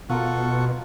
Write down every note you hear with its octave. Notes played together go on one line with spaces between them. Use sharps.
B2 F4 A4 A#4 F#5 C#6